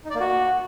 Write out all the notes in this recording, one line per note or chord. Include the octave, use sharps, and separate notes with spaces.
D#4
D5
A#3
F#4